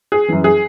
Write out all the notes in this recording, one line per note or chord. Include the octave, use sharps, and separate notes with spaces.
G#4
F#2 E3
G#4